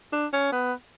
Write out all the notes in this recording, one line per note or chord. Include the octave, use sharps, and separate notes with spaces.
D4
C#4
B3